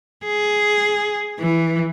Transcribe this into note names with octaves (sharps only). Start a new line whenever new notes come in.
G#4
E3